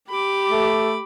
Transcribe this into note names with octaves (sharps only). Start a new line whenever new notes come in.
G4 B5 D6
A3